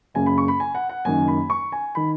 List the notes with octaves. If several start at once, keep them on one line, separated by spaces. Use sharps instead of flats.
F#1 F#2 C#3 G#5
B5
C#6
B5
G#5
F#5
F#5
F#1 F#2 D#3 G#5
B5
C#6
G#5
D#3 B5